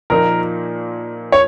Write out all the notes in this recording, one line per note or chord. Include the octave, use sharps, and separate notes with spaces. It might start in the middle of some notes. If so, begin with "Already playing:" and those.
A#2 F3 A#3 D#4 A#4
C#5